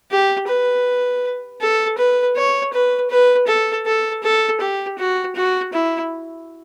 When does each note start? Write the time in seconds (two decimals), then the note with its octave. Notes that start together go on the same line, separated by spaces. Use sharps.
0.11 G4
0.48 B4
1.61 A4
1.98 B4
2.36 C#5
2.73 B4
3.10 B4
3.48 A4
3.86 A4
4.23 A4
4.60 G4
4.98 F#4
5.35 F#4
5.73 E4